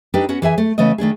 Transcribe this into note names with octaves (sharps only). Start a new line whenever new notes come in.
D4 D#4 G4 A4 B4
B3 C#4 F#4
E3 G#4 E5 G#5
A3
C#3 E3 A3 B3 D#5
D#3 A3 D4 G#4